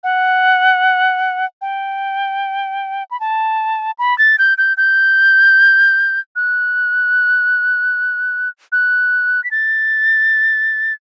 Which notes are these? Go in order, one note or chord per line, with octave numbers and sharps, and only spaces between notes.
F#5
G5
B5
A5
B5
A6
G6
G6
G6
F#6
F#6
B6
A6